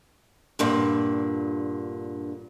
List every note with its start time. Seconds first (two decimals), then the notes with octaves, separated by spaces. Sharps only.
0.59 G2 A#2 D3